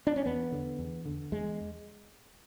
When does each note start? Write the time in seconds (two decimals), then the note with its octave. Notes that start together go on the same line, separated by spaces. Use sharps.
0.07 D4
0.16 C#4
0.26 E2 B3
0.52 D3
0.79 E2
1.05 D3
1.32 E2 G#3